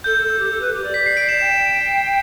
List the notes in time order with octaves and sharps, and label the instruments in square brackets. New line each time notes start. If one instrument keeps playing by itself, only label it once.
[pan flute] A4 [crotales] G6
[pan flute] A4
A4
G4
A4
B4
G4
D5
[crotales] B6
C7
D7
E7
[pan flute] G5 [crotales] E7